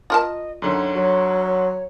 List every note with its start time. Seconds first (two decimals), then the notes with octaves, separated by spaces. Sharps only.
0.10 F4 A#4 D#5 A5
0.62 F#2 D3 D#3 C#5
0.95 F#3